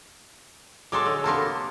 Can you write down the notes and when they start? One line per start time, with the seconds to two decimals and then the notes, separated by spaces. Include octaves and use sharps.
0.92 F#3 G#3 A4 C6 D6
1.06 D3
1.24 C3 A#3 B3 A5 C6